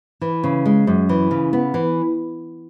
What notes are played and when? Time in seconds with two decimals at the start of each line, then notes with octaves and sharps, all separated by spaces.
0.21 E3
0.44 C#3
0.65 G#3
0.87 F#2
1.09 E3
1.31 C#3
1.53 B3
1.74 E3